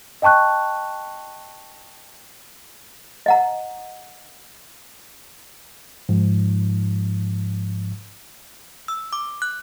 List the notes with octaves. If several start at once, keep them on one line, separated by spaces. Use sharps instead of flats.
D#5 G5 A5 C#6 F#6
D#5 F#5 A#5
G#2 F3
E6
D6
F#6